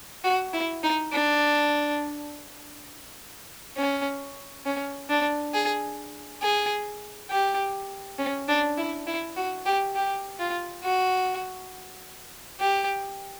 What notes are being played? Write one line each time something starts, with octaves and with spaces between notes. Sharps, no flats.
F#4
E4
D#4
D4
C#4
C#4
D4
G#4
G#4
G4
C#4
D4
E4
E4
F#4
G4
G4
F4
F#4
G4